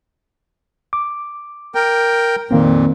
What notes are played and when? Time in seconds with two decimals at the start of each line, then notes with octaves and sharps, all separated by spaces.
0.93 D6
1.75 A#4 G5
2.51 F2 A#2 D#3 A#3 C4